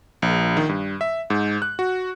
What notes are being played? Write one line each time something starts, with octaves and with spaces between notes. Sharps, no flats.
A#1
D#3
G2
E5
G#2
F#6
F#4